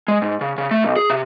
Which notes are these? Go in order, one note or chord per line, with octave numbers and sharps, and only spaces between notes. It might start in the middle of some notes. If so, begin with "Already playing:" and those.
G#3
G#2
C#3
C#3
A3
B1
G#4
C3